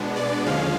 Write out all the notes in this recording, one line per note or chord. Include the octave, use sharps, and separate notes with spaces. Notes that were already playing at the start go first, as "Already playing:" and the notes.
Already playing: B2 G#3 B3 D4
D5
D#2 D3 F3 G#3 C#4 F5